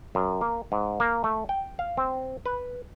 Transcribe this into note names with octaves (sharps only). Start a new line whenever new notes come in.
F#2
A#3
G#2
A#3
A3
G5
F5
C4
B4